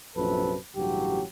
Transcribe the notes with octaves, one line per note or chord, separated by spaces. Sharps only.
A#1 F#2 C3 A4 B4
A1 G2 C#3 F#3 G4